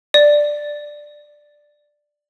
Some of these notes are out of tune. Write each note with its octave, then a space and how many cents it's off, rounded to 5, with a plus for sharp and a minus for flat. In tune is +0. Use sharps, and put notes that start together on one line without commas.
D5 +5